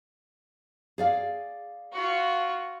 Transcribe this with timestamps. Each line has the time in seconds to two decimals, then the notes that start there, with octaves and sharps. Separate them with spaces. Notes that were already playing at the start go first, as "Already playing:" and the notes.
0.98 G#4 D5 F5
1.92 F4 F#4